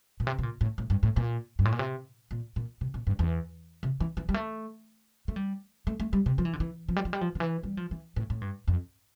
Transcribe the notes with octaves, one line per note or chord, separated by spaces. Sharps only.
A#2
C3
C3
A#2
A2
A2
G2
A2
A#2
G2
A2
A#2
C3
A#2
A#2
C3
A#2
G2
E2
C3
E3
E3
G3
A3
A3
G3
A3
A3
G3
C3
F3
E3
D3
E3
F3
G3
F3
G3
F3
D3
E3
G3
F3
E3
A2
A2
G2
F2